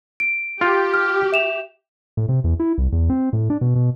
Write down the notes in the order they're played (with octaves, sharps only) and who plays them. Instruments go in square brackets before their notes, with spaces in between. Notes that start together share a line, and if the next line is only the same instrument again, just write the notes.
[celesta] D7
[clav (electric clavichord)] F4 [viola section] G4
[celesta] F6
E5 E7 F7
[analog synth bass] A2
C3
E2
E4
C2
E2
C4
A2
D4
B2
B2